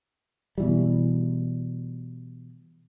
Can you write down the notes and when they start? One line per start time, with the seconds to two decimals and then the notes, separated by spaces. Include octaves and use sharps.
0.58 B2 E3 G3